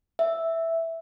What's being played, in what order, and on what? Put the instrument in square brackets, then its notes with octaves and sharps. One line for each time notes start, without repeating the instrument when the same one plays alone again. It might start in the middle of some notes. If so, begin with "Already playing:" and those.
[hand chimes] E5